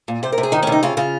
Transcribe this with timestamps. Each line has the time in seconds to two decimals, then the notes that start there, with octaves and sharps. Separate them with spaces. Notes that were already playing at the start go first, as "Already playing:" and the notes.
0.08 A#2
0.23 C3 C5
0.32 A#4
0.38 C3
0.43 G#4
0.52 D#3 D#4
0.63 C#4
0.67 C3
0.72 D#4
0.83 C#3 F4
0.97 C#3 F4